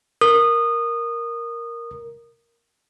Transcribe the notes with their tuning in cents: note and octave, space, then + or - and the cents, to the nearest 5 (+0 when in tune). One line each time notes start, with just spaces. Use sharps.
A#4 +0 D#6 -20